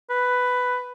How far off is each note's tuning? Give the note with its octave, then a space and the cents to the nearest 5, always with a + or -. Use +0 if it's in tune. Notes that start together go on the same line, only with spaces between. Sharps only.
B4 +10